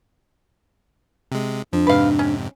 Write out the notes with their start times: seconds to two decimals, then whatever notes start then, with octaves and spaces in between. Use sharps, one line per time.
1.32 C3 G#3
1.73 F2 F3 D4
1.87 F2 G#2 C3 B4 F5
2.19 C#4